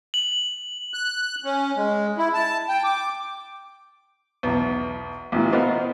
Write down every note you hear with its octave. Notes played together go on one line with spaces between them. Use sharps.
F#7
F#6
C#4
G#3
E4
A5
G5
D6
B1 E2
A1 A#2 E3
B3 C4 F4 A#4 B4 D#5